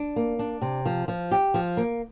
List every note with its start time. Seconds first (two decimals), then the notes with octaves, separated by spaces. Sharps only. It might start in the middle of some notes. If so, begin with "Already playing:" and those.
Already playing: D4
0.16 A#3
0.39 D4
0.62 C3
0.86 F3
1.08 F3
1.31 G4
1.54 F3
1.77 A#3